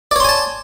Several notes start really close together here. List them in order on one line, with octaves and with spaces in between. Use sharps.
D5 C#5 C6 G#5 A5